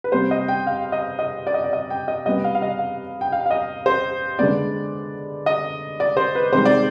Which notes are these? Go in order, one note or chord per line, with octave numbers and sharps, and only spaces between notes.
B4
C3 G3 B3 C5
D#5
G5
F5
D#5
D#5
D5
D#5
D5
D#5
G5
D#5
C3 G3 B3 D#5
F5
F5
D#5
F5
G5
F5
F5
D#5
C5
D3 G#3 B3 D5
D#5
D5
C5
B4
C3 D#3 G#3 C5
D5